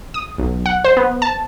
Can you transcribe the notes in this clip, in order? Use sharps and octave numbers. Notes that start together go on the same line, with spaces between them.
D#6
B1
F#5
C5
B3
A5